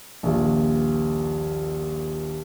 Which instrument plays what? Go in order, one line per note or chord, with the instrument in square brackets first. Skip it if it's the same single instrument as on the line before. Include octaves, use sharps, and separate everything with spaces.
[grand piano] D#1 A#1